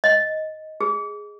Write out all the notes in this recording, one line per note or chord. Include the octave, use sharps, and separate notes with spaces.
D#5
G#4